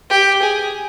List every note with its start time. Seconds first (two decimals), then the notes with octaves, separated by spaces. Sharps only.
0.10 G4
0.42 G#4